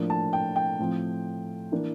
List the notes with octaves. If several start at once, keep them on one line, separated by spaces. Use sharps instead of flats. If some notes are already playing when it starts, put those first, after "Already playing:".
Already playing: A2 F3 A#3 D4
A5
G5
G5
A2 F3 C4
E3 A#3 D4